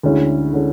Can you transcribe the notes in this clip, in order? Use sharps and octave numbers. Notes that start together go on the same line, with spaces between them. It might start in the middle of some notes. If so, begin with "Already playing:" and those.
D2 D3 G#3 C#4 E4
D3 G#3 C#4 E4